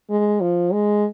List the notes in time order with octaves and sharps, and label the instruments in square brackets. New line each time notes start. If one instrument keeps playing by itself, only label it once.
[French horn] G#3
F3
G#3